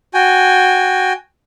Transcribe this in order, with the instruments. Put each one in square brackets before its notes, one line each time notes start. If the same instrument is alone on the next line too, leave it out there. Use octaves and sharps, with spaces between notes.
[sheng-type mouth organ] F#4 G5 G#5